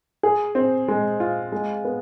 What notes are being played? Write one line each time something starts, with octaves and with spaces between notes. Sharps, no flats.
G#4
C4
G#3
F4
G#3
B3